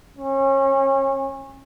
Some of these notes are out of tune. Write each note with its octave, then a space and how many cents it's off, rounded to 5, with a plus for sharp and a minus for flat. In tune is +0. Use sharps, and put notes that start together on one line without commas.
C#4 -30